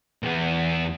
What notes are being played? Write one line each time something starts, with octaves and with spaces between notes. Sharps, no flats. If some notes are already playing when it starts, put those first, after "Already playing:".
E2 B3